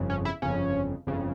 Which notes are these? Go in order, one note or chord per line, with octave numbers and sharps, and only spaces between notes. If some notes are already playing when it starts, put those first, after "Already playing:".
Already playing: G1 F2 C#3
C#4
E4
G1 F2 C#3 C#4
G1 F2 C#3